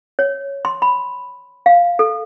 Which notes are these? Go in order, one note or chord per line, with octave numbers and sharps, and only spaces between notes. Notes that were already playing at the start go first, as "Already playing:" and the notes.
C#5
C6
B5
F5
A4